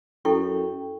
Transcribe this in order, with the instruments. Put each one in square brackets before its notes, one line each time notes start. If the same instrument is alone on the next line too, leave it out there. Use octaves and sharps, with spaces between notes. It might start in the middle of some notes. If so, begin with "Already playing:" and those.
[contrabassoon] F#2 [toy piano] E4 A4 C#6 [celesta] G5